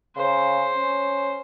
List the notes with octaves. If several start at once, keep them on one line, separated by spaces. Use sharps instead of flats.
C#3 C5
C#4